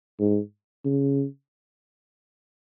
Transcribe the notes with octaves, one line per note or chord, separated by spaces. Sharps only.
G#2
C#3